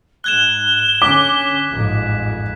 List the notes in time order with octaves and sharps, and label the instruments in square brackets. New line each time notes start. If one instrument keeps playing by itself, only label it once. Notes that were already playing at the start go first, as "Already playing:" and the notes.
[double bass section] G#2 [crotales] F#6 G#6 E7 [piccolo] G7
[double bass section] D3 C#4 [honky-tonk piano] D6 [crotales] B6
[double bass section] A1 F2 G#2